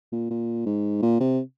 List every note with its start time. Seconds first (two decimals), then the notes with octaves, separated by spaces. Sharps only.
0.12 A#2
0.30 A#2
0.66 G#2
1.02 A#2
1.20 C3